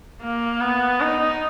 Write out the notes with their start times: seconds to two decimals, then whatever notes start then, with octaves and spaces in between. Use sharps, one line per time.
0.22 A#3
0.61 B3
1.01 D#4